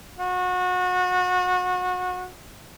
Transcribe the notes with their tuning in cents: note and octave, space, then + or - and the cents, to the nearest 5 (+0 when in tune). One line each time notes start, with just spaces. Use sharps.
F#4 -30